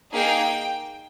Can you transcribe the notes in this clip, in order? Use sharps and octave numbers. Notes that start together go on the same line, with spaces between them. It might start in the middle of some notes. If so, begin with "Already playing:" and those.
A#3 D#4 G#4 G5